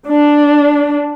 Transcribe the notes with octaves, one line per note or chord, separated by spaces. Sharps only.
D4